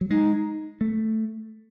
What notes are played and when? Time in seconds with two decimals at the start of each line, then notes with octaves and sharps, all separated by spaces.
0.01 F#3
0.10 G#3 D#4
0.81 A3